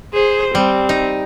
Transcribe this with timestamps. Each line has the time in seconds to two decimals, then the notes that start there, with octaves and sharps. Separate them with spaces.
0.13 G#4 C5
0.55 G3 C4
0.89 D#4